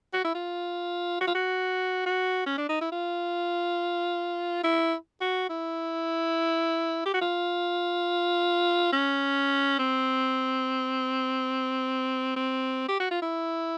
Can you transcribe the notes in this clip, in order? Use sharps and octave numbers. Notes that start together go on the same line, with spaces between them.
F#4
E4
F4
F#4
F4
F#4
F#4
C#4
D4
D#4
E4
F4
E4
F#4
E4
G4
F#4
F4
C#4
C4
C4
G4
F#4
F4
E4